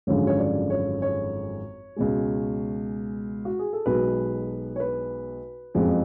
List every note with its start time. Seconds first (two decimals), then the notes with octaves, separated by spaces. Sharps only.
0.07 G#1 F#2 D3 F3 G#3 C#5
0.27 C#5
0.39 D5
0.70 C#5
1.02 C#5
1.96 C#2 B2 G#3
3.45 F#4
3.59 G#4
3.73 A4
3.86 B1 B2 G#3 B4
4.76 C#5
4.80 B4
5.74 F#1 F2 F3 G#3